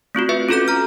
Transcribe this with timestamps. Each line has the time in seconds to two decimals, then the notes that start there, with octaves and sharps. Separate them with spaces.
0.15 A3 C4 F4 F#4
0.29 C4 B4 E5
0.49 C#4 F4 F#4 A4 D6 G6
0.68 A#5 F6